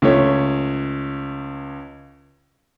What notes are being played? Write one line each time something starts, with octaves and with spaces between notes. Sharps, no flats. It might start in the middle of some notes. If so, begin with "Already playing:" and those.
C#2 A3 C#5